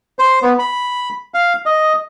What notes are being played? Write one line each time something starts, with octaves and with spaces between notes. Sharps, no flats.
C5
B3
B5
F5
D#5